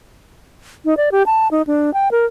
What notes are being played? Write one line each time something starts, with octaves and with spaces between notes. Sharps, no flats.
D#4
D5
G4
A5
D#4
D4
G5
A#4